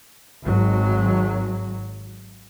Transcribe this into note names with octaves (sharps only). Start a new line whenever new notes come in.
G#1 F#3